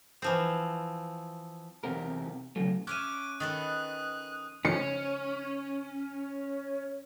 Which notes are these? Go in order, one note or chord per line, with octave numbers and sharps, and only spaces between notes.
E3 F3 C4
E2 C3 C4 A#4
C#3 E3 F#3 A3
C#4 C#5 E5 D6 F#6 D#7
D#3 A4 B4 D#6 F#6
C#4 C#7